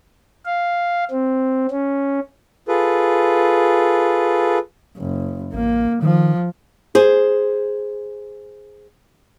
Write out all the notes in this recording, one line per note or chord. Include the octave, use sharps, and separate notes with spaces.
F5
C4
C#4
F4 G#4 A4 B4
F#1
A1 A#3
D#3 F3
G#4 C5